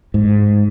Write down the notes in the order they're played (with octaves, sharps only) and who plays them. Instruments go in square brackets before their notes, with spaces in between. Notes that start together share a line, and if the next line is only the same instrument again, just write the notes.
[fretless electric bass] G#2